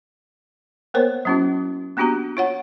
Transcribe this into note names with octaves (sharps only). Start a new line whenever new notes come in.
A#3 B3 A#4 C5 C#5
F#3 A#3 C#4 E4 F#4
A#3 B3 D4 F#4 G4 A#5
F4 C#5 F#5